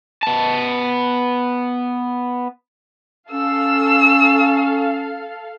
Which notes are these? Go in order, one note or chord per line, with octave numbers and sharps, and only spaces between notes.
B3 A5
C#4 A4 F5 E6